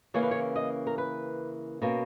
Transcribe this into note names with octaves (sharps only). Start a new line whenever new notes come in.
C#3 E3 A#3 C#4 C#5
B4
C#5
D#5
A#4
B4
B2 A#3 C#4